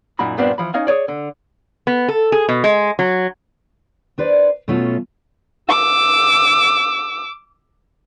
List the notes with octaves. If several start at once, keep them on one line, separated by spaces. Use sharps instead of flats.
F#2 A#2 D#4 F#4 B5
G2 A#2 B3 C4 D4
E3 F3 B5
C#4 D#4 D#5 F5 G#5
G#4 B4 C#5 D5
D3
B3
A4
G#4
B2
G#3
F#3
D4 B4 C5 D5
B2 F#3 A3 C#4 F4 A5
D6 E6